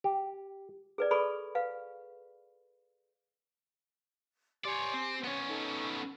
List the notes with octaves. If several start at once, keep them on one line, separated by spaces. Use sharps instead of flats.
G4
G#4 B4 D5
G#4 A4 B4 D5 B5 C#6
B4 F5
G4 C#5 D5 G#5 C6
C4
B3 C#4 C#5
D#4 A4